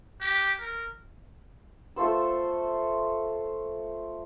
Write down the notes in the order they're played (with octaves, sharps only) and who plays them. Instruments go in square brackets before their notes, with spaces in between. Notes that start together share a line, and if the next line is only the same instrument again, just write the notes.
[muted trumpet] G4
A#4
[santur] A3 F4 C5 E6